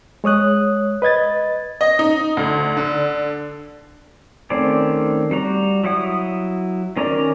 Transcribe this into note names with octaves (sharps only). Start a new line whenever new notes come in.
G#3 C#5 D#6 F#6
B4 D#5 G#6 A6
D#5
D#4
D2
D3
D#3 A3 C4 C#4 D5
G3 F#4 A#5
F#3 E4 F#5 D#6
D#3 C#4 A#4 D5 A#5